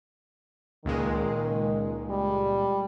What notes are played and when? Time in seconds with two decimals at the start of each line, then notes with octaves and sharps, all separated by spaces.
0.85 C#2 A#2 D#3 G#3
2.10 G3